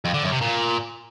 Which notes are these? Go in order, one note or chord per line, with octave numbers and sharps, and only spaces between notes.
F2
D3
F#2
C3
A#2